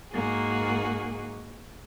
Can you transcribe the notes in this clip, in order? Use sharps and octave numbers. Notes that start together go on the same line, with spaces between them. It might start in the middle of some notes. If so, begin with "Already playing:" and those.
G#2 A#3 F#4 G#4